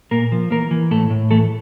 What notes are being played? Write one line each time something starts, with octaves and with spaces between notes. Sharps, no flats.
A#2 A#3 A#4
F3
E3 A#3 A#4
E3
A2 A3 A4
A2
E3 A3 A4